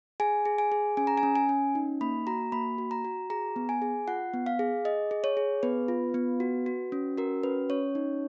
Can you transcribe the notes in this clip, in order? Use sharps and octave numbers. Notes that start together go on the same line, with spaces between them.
G#4 G#5
G#4
G#5
G#4
C#4 G#5
A#5
G#5
C#4
G#5
C#4
D#4
A#3 B5
F#4 A#5
A#3 B5
F#4
A#5
F#4
G#4 A#5
B3
G#5
G#4
F4 F#5
B3
F5
G#4
G#4 D#5
G#4
C#5
G#4
B3 B4
F4
B3
F#4
F#4
C#4
F#4 A#4
C#4 B4
C#4 C#5
D#4